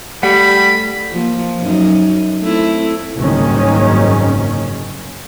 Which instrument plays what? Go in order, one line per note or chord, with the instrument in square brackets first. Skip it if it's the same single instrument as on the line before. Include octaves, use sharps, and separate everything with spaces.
[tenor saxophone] G3 [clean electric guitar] A3 F#5 [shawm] B5
[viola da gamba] F3 A#3
F#2 D#4
A3 C4 E4
[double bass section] F#1 C2 G#2 D#3 C#4